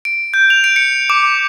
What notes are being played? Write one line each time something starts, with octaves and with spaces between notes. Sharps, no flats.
D7
G6
F7
D7
C#7
D6